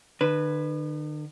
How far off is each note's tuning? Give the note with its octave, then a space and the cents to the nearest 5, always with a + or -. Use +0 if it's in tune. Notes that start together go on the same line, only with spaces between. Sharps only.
D3 +45 B4 +0